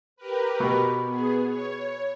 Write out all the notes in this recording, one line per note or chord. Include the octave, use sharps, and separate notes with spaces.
G4 A#4 B4
B2
B3 G#4
C#5